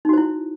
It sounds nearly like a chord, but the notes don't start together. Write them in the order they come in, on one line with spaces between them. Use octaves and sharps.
D#4 F#4 C5 E4